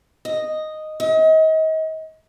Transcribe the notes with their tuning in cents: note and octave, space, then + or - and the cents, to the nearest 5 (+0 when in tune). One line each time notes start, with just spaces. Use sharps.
D#5 -5
D#5 +35